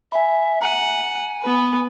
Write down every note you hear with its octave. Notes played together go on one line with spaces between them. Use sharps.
E5 G#5 B5
F#5 G#5 A#5
B3 B4